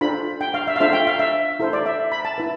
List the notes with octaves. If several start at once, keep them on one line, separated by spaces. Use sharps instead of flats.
D4 F4 A4 C5 B5
G5
F5
E5
F5
D4 F4 A4 C5 E5
G5
F5
E5
E4 A4 C5
D5
E5
B5
A5
E4 B4